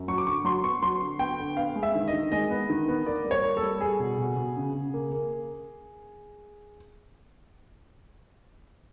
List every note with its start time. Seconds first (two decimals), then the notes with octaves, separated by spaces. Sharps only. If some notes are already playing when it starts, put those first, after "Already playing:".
Already playing: F#2
0.08 F#3 C#6
0.18 D6
0.26 D3 C#6
0.45 F#3 C6
0.64 B3 C#6
0.83 F#3 C6
1.01 D3
1.19 B3 G5
1.39 D3
1.57 B3 F5
1.76 G#3
1.83 E5
1.95 D#3
2.08 D#5
2.13 D#3
2.32 G#3 D#5
2.50 B3
2.70 D#3
2.88 B3
3.06 A#3 D5
3.25 G3
3.31 C#5
3.45 A#3
3.57 A4
3.63 G3
3.81 G3 G#4
4.00 B2
4.18 B2
4.37 B2
4.57 C#3
4.74 C#3
4.94 A#3
5.12 A#3